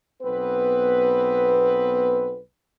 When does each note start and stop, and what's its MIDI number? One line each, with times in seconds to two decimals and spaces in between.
0.22 2.39 35
0.22 2.39 59
0.22 2.39 60
0.22 2.39 71